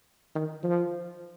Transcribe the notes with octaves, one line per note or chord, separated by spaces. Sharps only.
D#3
F3